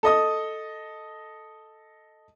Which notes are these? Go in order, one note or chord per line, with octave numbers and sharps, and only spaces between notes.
A4 D#5 D#6